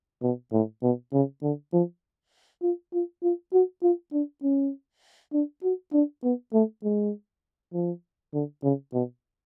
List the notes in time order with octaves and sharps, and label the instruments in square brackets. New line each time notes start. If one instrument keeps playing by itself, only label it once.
[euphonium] B2
A2
B2
C#3
D3
F3
F4
F4
F4
F#4
F4
D4
C#4
D4
F#4
D4
B3
A3
G#3
F3
D3
C#3
B2